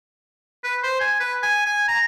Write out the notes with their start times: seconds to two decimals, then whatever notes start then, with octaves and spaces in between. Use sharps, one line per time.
0.64 B4
0.83 C5
1.00 G#5
1.20 B4
1.42 G#5
1.66 G#5
1.88 A#5